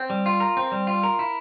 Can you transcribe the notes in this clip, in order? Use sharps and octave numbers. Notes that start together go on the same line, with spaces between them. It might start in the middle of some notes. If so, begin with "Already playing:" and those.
Already playing: C4
G3
F4
A#4
C4
G3
F4
A#4
E4